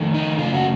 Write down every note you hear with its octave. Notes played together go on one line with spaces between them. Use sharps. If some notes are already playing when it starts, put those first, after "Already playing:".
Already playing: F2 D#3 A3
D#4
F#2 C#3 A3 F4
F#4